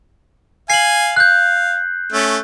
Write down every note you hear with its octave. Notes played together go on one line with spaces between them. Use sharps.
F5 G#5 C7 F#7
F5 F#6 G6
A3 C#4